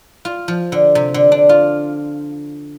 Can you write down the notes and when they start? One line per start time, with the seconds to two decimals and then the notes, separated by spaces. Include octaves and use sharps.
0.25 F4
0.48 F3
0.72 D3
0.95 C3
1.14 D3
1.32 D4
1.49 F4